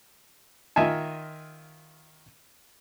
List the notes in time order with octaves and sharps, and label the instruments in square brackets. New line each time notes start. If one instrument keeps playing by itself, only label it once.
[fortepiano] D#3 F4 D#5 E5 G#5